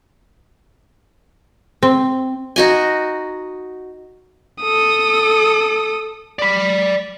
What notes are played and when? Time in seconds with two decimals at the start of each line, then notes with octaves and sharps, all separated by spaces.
1.83 C4
2.56 D#4 F#4 G#5
4.62 A4 D#6
6.39 D5 B5